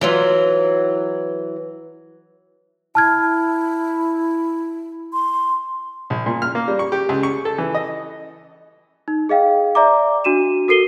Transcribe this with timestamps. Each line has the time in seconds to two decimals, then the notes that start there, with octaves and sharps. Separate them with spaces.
0.01 E3 F#3 F4
2.95 E4 A5 F6 G#6
5.13 C6
6.10 A#1
6.26 A#2
6.42 F6
6.55 A#3
6.68 G3
6.79 C#6
6.92 G4
7.09 C#2
7.23 C#6
7.45 A4
7.58 E3
7.75 D#5
9.08 D#4
9.29 G#4 D#5 F5 G5
9.75 D5 E5 A#5 D6
10.24 D4 F#4 D#7 E7
10.68 F#4 A4 A#4 C7 D#7 G7